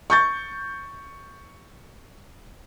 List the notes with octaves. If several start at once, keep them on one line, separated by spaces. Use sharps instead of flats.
C#6 G6 A6